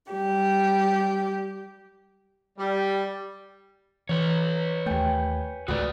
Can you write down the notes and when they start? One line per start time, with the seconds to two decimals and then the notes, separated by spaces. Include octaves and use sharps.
0.12 G3 G4
2.58 G3
4.09 E3 B4 C#5 B5
4.86 D#2 A3 G5 G#5
5.68 C#2 G#2 D#3 B3 F#4 D5